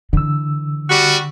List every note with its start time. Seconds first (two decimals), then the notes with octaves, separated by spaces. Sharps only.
0.13 D3 E3 E6
0.89 G3 F#4